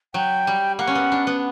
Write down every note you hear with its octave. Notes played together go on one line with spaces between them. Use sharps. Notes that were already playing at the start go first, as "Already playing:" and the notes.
F#3 G5
G3
A#3 F#5
C#4
B3
D4
B3